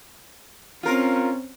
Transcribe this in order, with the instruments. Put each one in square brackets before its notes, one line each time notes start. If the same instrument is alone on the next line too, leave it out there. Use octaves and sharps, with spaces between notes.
[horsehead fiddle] C4 C#4 [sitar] F4 A#4